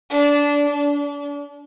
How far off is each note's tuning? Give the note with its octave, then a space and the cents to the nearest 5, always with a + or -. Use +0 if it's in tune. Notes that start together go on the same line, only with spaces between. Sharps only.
D4 -20
D4 -35